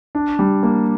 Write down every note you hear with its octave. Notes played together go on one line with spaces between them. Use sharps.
D4
G3
A#3